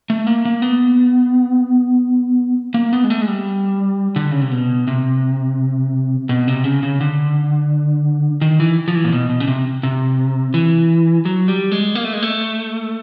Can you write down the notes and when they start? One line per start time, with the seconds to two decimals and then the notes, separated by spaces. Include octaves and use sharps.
0.10 A3
0.27 A#3
0.45 A#3
0.62 B3
2.74 A#3
2.93 B3
3.04 G#3
3.10 A3
3.22 G#3
3.28 G3
4.16 D3
4.31 C#3
4.41 C3
4.51 B2
4.88 C3
6.29 B2
6.47 C3
6.64 C#3
6.83 C#3
7.01 D3
8.41 D#3
8.60 E3
8.88 F3
8.95 E3
9.04 A#2
9.12 B2
9.30 B2
9.40 C#3
9.47 C3
9.83 C3
10.54 E3
11.25 F#3
11.48 G3
11.71 G#3
11.95 A#3
12.05 A3
12.13 G#3
12.22 A3